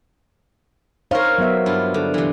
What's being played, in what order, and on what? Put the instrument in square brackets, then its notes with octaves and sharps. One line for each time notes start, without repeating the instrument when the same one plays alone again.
[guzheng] D#4 A#4 [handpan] C5 C#5 F5
[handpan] F#3 B3 E5
[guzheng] G2 E4 F4
D3
C3 E3